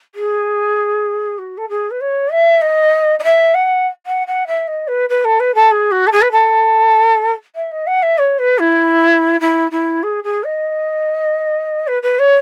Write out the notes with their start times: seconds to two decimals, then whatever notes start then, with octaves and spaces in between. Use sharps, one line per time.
0.15 G#4
1.39 F#4
1.58 A4
1.69 G#4
1.91 B4
2.01 C#5
2.32 E5
2.62 D#5
3.19 D#5
3.24 E5
3.54 F#5
4.06 F#5
4.27 F#5
4.47 E5
4.68 D#5
4.88 B4
5.10 B4
5.25 A4
5.40 B4
5.55 A4
5.71 G#4
5.91 F#4
6.07 A4
6.12 G#4
6.22 B4
6.32 A4
7.55 E5
7.72 D#5
7.87 F#5
8.03 E5
8.18 C#5
8.39 B4
8.59 E4
9.41 E4
9.71 E4
10.03 G#4
10.24 G#4
10.44 D#5
11.87 B4
12.03 B4
12.19 C#5